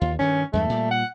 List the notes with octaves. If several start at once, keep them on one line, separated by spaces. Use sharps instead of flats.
D#2 F4
G2 D#3 C#4
E2 G2 G#3 A3
A#2 G3
F#5